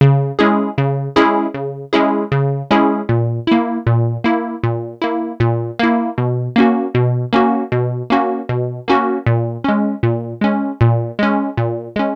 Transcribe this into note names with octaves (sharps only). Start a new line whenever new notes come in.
C#3
G#3 C#4 E4 G#4
C#3
G#3 C#4 E4 G#4
C#3
G#3 C#4 E4 G#4
C#3
G#3 C#4 E4 G#4
A#2
A#3 E4
A#2
A#3 E4
A#2
A#3 E4
A#2
A#3 E4
B2
A#3 C#4 F#4
B2
A#3 C#4 F#4
B2
A#3 C#4 F#4
B2
A#3 C#4 F#4
A#2
G#3 C#4
A#2
G#3 C#4
A#2
G#3 C#4
A#2
G#3 C#4